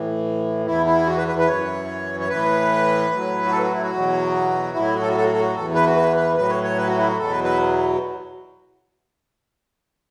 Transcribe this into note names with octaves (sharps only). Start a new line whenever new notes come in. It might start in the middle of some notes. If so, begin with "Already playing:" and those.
Already playing: A2 E3
E2 E3 E4
E4
F#4
B4
B4
B4
F#2 C#5
E3
C#5
A2 E3 B4
A2 F#3
F#4
A4
F#4
E4
F#4
E2 B2 F#3
A2 F#3 E4
F#4
A4
F#4
A4
F#4
A4
F#4
E2 E3 A4
B4
F#4
B4
B4
A2 F#3 B4
C#5
C#5
B4
F#4
E4
F#4
E2 B2 F#3 A4
B4
B4